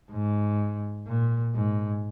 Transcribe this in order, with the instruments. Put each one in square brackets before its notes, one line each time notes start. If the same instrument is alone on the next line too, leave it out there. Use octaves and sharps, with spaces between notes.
[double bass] G#2
A#2
G#2